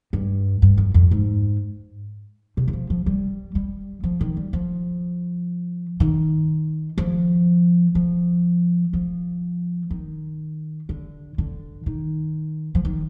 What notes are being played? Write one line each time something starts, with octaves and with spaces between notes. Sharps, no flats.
G2
G2
F2
F2
G#2
C3
D#3
F3
F3
G3
G3
F3
D#3
G3
F3
D#3
F3
F3
F3
D#3
D3
D3
D#3
F3
D#3